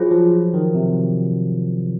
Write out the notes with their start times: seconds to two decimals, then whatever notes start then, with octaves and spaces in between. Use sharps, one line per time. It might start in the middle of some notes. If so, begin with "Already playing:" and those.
Already playing: F#3 F4 G#4 C5
0.11 F3
0.54 D#3
0.75 C3